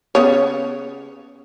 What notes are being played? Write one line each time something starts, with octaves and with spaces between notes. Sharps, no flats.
C#3 B3 C#5